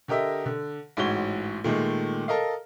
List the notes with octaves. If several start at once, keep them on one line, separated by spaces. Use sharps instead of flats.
D3 G4 A#4 D#5 E5
D3
A1 G#2 F#4 C#5 G7
A#2 D#3 G#3 A3
A4 A#4 D#5 F5